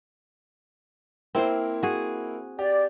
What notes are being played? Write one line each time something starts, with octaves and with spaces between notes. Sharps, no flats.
A#3 C4 E4 A#4 C5
F#4 G#4
G4 D5